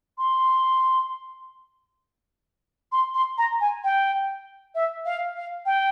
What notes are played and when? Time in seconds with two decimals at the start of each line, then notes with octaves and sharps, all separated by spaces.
0.18 C6
2.92 C6
3.14 C6
3.38 A#5
3.61 G#5
3.84 G5
4.75 E5
5.05 F5
5.36 F5
5.66 G5